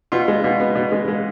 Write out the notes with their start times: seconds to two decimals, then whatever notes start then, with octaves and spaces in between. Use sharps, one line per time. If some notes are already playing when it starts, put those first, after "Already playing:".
0.12 B2 F4
0.28 G#3
0.44 B2
0.60 B3
0.75 B2
0.92 G#3
1.08 G#3